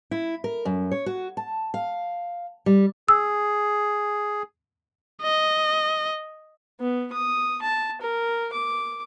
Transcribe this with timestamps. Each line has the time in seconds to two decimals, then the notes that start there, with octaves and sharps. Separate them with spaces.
0.11 E4
0.44 A#4
0.65 F#2
0.91 C#5
1.06 F#4
1.37 A5
1.74 F5
2.66 G3
3.08 G#4 E6
5.22 D#5
6.80 B3
7.12 D#6
7.62 A5
8.01 A#4
8.53 D6